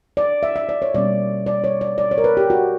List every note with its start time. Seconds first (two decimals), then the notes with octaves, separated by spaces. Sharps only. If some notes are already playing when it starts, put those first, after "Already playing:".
0.17 D5
0.43 E5
0.56 E5
0.69 D5
0.82 C#5
0.94 B2 G3 A#3 C#4 D5
1.46 D5
1.64 C#5
1.81 D5
1.98 D5
2.11 C#5
2.18 A#4
2.24 B4
2.37 G4
2.50 F#4